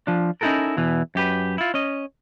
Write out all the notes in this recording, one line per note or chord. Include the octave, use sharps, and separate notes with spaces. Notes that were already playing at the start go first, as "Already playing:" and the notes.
F3 D4
C#4 D#4 E4 F#4 A4 A#4
E2 B2 E3
F#2 G4 B4
E4 F4
C#4 D#5